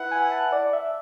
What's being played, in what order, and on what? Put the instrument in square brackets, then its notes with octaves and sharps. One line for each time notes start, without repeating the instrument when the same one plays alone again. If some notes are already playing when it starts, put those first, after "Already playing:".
Already playing: [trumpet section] E4 B4 F#5
[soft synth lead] G#5
A5
D5
E5